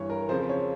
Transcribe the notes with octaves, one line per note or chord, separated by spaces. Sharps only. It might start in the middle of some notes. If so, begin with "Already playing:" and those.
Already playing: G2 E3 C#5
A#4
F2 C#3 F3 C5
C#5